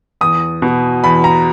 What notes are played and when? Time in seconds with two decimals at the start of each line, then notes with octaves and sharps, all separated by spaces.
0.21 E2 D#6
0.62 B2
1.04 E2 B5
1.24 A#5